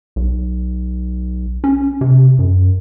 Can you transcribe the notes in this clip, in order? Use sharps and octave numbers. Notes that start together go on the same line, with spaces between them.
B1
C#4
C3
F#2